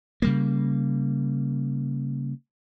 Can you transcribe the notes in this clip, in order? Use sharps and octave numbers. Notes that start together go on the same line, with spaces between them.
C#3 G3 A#3